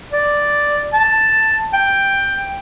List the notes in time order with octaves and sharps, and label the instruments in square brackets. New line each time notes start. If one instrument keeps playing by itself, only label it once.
[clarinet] D5
A5
G5